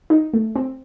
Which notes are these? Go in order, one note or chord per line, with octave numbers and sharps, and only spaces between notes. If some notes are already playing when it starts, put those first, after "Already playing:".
D#4
A3
C4